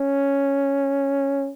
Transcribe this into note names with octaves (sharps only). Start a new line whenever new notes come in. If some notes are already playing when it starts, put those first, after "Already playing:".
Already playing: C#4